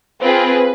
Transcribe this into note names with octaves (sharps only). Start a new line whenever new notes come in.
C4 F4 G#4 B4